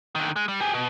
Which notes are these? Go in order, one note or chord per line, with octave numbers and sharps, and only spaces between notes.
D3 D#3
G#3
G3
G4 G#4
B2